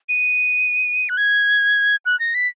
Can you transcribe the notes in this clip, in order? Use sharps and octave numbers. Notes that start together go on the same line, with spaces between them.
D#7
F#6
G#6
F#6
A#6
B6